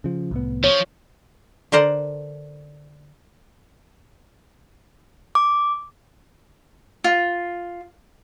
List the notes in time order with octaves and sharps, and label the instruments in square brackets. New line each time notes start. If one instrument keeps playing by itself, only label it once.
[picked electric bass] C#3 F3
C2 A2 B3
[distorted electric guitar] F3 [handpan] C#5
[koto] D3 A#4 C5 D5 F#5
[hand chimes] D6
[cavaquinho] F4